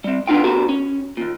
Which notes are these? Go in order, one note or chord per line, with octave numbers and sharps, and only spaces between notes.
G3 C4
B3 D4 D#4 F4 G5
B3 F#4 G4 A#4
C#4
D#2 A#2